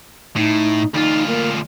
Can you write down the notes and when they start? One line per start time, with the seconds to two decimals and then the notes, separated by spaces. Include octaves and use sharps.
0.36 A2 D#4
0.94 D2 D#4 F4
1.27 A#3